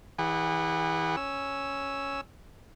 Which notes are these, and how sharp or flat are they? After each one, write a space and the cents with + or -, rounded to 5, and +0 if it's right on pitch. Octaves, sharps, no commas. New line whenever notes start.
E3 -20 G#4 -40 F#5 +5
C#4 +0 E6 +0